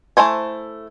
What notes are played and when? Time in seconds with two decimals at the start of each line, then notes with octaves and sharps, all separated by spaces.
0.17 A3 E4 C5 G#5